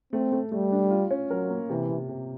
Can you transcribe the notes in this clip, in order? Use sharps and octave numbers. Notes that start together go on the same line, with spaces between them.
A3 C4
A3
G3 A3
D4
F4
C#4
F#3 A#4
A#3
C3 E3
C3
C3